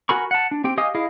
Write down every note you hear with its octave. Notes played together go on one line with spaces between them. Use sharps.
F#4 A#4 G#5 B5 C#6
F#5 A5
D4
C4 G4 G5
G4 D#5 F5 G#5 D#6
E4 G#4 D#5 F5